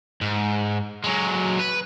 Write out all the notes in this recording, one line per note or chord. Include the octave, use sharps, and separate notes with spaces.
G#2
F#3 G#3
B4